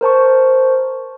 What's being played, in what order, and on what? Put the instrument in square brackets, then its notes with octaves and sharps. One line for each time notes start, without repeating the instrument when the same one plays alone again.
[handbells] A#4 C5 A5 C#6